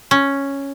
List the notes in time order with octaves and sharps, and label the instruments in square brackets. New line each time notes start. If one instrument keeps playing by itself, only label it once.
[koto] C#4